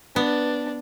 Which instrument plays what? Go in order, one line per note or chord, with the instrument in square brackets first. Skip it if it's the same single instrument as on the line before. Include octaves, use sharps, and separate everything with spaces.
[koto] B3 [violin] D4